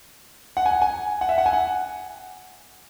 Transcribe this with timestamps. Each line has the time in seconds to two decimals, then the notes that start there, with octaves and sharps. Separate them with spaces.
0.57 F#5
0.66 G#5
0.73 F#5
0.82 G#5
1.21 F#5
1.29 E5
1.38 F#5
1.46 G#5
1.53 F#5